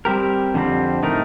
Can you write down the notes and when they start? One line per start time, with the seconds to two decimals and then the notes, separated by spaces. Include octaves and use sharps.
0.05 G3 C4 G4 A#4
0.54 F2 D3 G3 C4
1.03 A2 A3 D#4 A#4